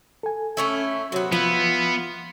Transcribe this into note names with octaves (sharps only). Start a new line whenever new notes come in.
A4 G#5
A3 C#4 E4
C3 F#3 B3
E3 F3 B3 E4 F4